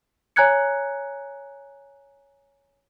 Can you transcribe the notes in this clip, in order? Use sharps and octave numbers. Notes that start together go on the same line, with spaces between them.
C#5 G#5 A#5 F#6 G#6 C#7